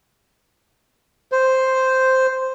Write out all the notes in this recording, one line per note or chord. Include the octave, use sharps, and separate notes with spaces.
C5